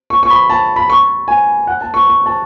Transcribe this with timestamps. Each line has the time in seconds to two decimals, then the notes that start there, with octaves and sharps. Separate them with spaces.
0.10 C#6
0.23 C#6
0.30 B5
0.50 A5
0.76 B5
0.90 C#6
1.28 G#5
1.67 F#5
1.81 A5
1.94 C#6
2.07 C#6
2.26 A5